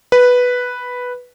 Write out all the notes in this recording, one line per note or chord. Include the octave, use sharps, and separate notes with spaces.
B4